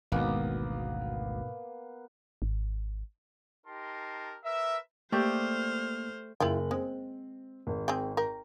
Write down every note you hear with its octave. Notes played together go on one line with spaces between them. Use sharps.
G#1 D2 G#2 B2 A#3 B3 B4
G#1
D#4 G4 A#4 A5 C6
A#4 B4 E5
A3 A#3 G4 C5 D5 F6
F#1 E4 F4 G5 F#7
G#3 C4
G#1
C4 G#4 G5
A#4 G5